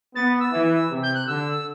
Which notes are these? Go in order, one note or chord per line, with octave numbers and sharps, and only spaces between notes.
B3 A6
E6
E3
C3
G6
F#6
D3 E6